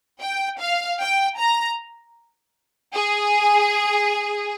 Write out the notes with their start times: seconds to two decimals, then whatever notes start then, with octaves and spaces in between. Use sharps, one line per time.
0.21 G5
0.60 F5
0.99 G5
1.38 A#5
2.93 G#4